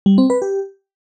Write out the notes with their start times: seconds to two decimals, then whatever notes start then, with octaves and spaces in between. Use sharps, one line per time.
0.06 G3
0.18 C4
0.30 B4
0.42 G4